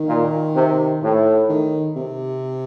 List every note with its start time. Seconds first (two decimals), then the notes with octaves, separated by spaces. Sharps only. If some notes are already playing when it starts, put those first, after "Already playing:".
Already playing: D#3
0.08 A#2
0.55 C3
1.02 A2
1.49 D#3
1.96 C3